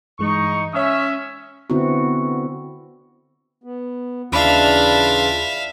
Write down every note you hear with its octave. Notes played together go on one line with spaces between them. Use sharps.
G2 E3 G#3 D#4 C#6
C#4 C#5 E5 D#6
D3 B3 C4 E4 F#4
B3
D#2 C#3 E3 D4 F4 E5 F5 B5